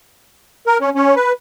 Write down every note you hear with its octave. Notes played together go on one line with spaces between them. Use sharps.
A#4
C#4
C#4
B4